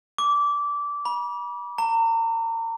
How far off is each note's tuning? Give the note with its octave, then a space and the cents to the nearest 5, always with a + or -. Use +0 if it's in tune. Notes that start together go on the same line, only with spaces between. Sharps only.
D6 -20
B5 -40
A#5 -40